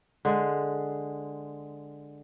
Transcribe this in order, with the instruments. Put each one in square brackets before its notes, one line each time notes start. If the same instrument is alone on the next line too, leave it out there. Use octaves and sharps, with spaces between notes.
[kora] D3 G#3